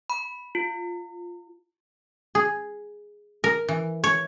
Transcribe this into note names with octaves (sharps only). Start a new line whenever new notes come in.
B5
F4
G#4
A#4
E3
C#5